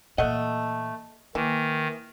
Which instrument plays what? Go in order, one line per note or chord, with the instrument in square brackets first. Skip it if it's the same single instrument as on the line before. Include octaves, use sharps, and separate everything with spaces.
[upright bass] A#2 E3 [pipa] A3 F#5 [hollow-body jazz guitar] D#5
[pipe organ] D#3 [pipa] E3 [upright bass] A#3